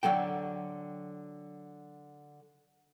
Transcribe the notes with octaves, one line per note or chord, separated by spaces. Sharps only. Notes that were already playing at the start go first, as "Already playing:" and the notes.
D3 F#3 A4 G5